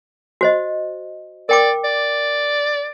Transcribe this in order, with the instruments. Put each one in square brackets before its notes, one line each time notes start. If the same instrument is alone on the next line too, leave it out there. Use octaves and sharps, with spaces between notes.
[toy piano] F#4 C5 D#5
[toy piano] A#4 G5 D6 [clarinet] D5
[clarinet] D5